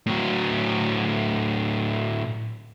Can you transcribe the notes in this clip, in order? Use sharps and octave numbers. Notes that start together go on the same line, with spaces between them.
A2 F#3